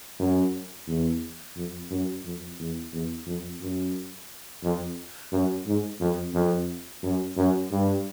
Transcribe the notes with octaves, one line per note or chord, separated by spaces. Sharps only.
F#2
E2
F2
F#2
F2
E2
E2
F2
F#2
F2
F#2
G#2
F2
F2
F#2
F#2
G2